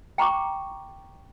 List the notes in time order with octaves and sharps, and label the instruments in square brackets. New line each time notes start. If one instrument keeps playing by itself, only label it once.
[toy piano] G5 A#5 C#6 D6